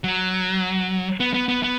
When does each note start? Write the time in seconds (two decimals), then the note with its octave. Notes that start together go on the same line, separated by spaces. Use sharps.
0.04 F#3
1.20 B3
1.34 B3
1.48 B3
1.63 B3